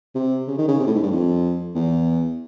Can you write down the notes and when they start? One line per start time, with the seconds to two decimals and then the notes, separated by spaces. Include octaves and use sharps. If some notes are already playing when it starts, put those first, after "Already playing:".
0.15 C3
0.48 C#3
0.58 D#3
0.68 C#3
0.79 C3
0.87 A2
0.95 G#2
1.03 G2
1.11 F2
1.75 E2